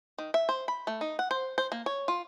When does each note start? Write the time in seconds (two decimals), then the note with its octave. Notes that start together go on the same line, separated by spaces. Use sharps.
0.18 D#3
0.34 E5
0.49 C5
0.68 B5
0.87 A3
1.01 D#4
1.19 F#5
1.31 C5
1.58 C5
1.72 A#3
1.86 C#5
2.08 F4